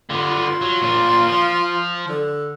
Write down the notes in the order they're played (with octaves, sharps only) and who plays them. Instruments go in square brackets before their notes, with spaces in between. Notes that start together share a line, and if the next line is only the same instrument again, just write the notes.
[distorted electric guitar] D3 B3 [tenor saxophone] F4
[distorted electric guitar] F#3
A#2 D4
F3
[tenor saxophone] D3